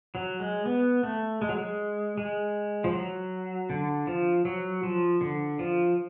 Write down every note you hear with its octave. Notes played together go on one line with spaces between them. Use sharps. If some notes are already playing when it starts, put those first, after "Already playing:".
F#3
G#3
B3
A3
G#3
F#3
G#3
G#3
F3
F#3
D3
F3
F#3
F3
D3
F3